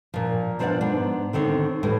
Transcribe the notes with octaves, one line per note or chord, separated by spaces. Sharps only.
A#2 F3
B2 F3 D4 G#4 D5 F#5
G#2 B3 D4
D3 D#3 C4 C#5
A2 E3 G3